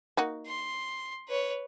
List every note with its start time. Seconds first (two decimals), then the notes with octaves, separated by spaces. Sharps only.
0.17 A#3 D#4 F#4
0.46 C6
1.28 B4 C#5